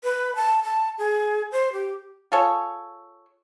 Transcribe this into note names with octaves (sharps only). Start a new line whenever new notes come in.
B4
A5
A5
G#4
C5
G4
F4 G#4 A4 C#5